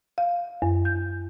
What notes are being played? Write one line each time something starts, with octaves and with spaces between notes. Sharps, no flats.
F5
F#2
G6